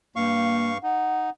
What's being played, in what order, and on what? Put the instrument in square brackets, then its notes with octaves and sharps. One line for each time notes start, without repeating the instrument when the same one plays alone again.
[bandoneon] G2 F5 C#6 [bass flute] A#3
[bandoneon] D#4 [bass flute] F#5